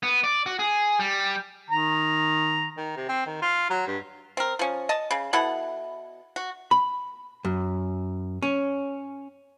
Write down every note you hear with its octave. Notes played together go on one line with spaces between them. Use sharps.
B3
D5
F#4
G#4
G3
D#3 A#5
D#3
C3
C4
D#3
F4
F#3
G2
C4 A#4
F3 C#4
D#5 A5
C#3
B2 E4 A4 F#5
F#4
B5
F#2
C#4